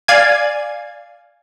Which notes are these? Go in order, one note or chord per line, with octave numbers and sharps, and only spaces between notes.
D5 F5 G#5 G#6